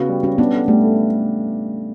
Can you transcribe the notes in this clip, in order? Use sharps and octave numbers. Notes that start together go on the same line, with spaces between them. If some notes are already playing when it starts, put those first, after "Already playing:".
Already playing: C#3 B3 F#4
G3
G3 C#4
B3 D4
A4
G3 A3
A4